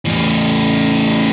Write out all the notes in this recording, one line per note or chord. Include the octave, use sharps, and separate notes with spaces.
E2 A2